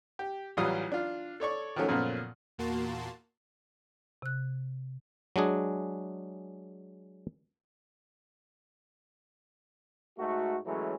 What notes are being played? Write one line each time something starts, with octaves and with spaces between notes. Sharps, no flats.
G4
A1 E3 F#3 G3 F4 D#6
D4 F4
A4 C#5 D5 C#6
D#3 F3 F#3 A3 C#4
F#2 A#2 C#3 F3 A3 B3
E2 A#2 A#3 F#4 A5 C6
C3 F#6
F#3 G#3 D4 G#4
G#2 A3 F#4
E3 F#3 G#3 A3 C#4